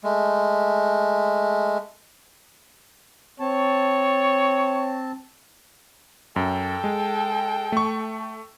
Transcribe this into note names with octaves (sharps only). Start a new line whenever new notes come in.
G#3 A3
C4 C#5 A5
F#2 A4 G5
G#3
A3 C#6